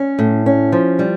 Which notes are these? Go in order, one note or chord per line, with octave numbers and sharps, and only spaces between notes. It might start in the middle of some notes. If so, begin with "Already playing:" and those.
Already playing: C#4
A2
C#4
F3
G3